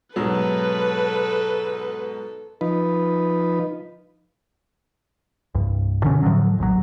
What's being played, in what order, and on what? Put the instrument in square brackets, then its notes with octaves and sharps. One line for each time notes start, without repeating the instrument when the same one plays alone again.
[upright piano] G#2 B2 F#3 [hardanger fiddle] A4 [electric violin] B4
[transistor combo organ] F3 D#4 B4
[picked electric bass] C2 G2
B2 D3 D#3 C#4
A2 D3 F3 F#3
F1 A#1 F#3